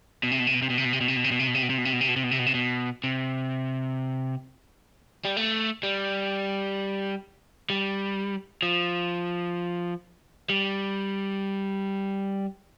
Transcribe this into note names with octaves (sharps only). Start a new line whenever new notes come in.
B2
C3
B2
C3
B2
C3
B2
C3
B2
C3
B2
C3
B2
C3
B2
C3
B2
C3
B2
C3
B2
C3
B2
C3
B2
C3
B2
C3
B2
C3
B2
C3
G3
A3
G3
G3
F3
G3